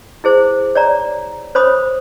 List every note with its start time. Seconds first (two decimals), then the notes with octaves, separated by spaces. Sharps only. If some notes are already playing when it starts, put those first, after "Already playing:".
0.24 E4 G#4 C5
0.75 C#5 D5 A#5
1.55 C5 C#5 B5 D#6